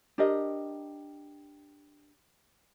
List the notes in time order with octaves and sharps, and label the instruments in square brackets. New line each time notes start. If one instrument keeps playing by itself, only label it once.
[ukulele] D4 G4 A#4 D#5